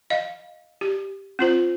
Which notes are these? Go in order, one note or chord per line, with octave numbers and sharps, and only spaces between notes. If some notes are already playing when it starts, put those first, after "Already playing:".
D#5 F5
G4
C4 F4 C5